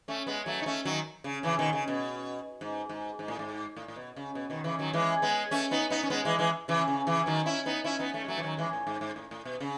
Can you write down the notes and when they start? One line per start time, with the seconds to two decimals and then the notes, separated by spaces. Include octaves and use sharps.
0.08 A3 C#4
0.27 G#3 B3
0.46 F#3 A3
0.62 D#4
0.66 A3 C#4
0.85 D#3 F#3
1.24 C#3
1.43 C#3 E3
1.59 B2 D#3
1.73 C#3
1.88 B2
2.61 G#2
2.89 G#2
3.19 G#2
3.28 A2
3.39 G#2
3.76 A2
3.88 A2
3.96 B2
4.16 C#3
4.35 B2
4.50 B2 D#3
4.64 C#3 E3
4.79 D#3 F#3
4.93 E3 G#3
5.22 G#3 B3
5.51 A3 C#4
5.71 B3 D#4
5.90 B3 D#4
6.03 C#4
6.10 G#3 B3
6.25 E3 G#3
6.39 E3 G#3
6.68 C#3 E3
6.88 C#3
7.07 C#3 E3
7.26 D#3 F#3
7.46 C#4 E4
7.66 B3 D#4
7.84 C#4 E4
7.99 B3 D#4
8.14 A3 C#4
8.24 G#3
8.28 F#3 A3
8.38 E3
8.43 D#3 F#3
8.57 E3 G#3
8.73 A2
8.87 G#2
9.01 G#2
9.16 A2
9.31 A2
9.45 B2
9.60 C#3